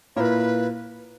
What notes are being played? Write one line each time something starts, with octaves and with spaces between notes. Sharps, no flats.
A#2 A#3 E4 A#4 B4 C#5